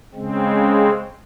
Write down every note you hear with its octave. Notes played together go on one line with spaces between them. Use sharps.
C#3 G#3 C4